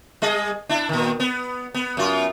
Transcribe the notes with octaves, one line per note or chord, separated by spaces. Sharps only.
G3 G#4 D#5
D4 E4
A#2 D#3
B3
B3
F#2 F4